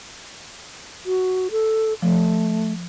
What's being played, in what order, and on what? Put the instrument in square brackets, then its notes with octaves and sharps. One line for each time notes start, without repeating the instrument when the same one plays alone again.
[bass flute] F#4
A4
[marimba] F3 [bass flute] A3